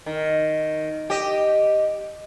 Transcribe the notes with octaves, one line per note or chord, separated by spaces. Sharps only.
D#3
G4 D#5